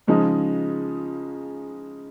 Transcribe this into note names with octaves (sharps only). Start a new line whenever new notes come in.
C#3 F3 G#3 D#4